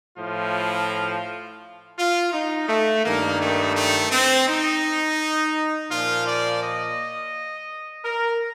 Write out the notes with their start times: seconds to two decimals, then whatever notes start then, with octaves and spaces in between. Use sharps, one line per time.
0.18 A2 F3 F4
1.98 F4
2.33 D#4
2.69 A3
3.04 G2 D#3 A#3
3.40 A3
3.76 A3
4.11 C4
4.48 D#4
5.91 A#2 F3 F4
6.27 D5
6.63 D#5
8.05 A#4